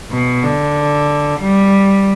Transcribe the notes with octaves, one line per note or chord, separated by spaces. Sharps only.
B2
D3
G3